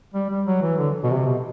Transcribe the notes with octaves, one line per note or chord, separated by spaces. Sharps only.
G3
G3
F#3
E3
D3
B2
C3
B2